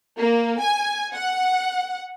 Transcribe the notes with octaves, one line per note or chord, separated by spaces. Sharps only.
A#3
G#5
F#5